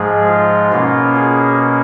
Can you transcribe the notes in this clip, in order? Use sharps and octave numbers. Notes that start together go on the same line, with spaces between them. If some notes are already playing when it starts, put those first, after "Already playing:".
Already playing: G#2 F3 G#3 G#4
F4
B2 A#3 C#4 F4
G#4